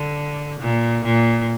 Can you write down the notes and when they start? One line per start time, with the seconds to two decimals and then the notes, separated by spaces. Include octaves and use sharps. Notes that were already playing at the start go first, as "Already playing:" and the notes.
Already playing: D3
0.60 A#2
1.04 A#2